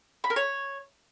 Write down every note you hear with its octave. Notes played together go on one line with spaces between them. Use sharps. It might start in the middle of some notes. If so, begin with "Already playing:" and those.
B5
A#4
C#5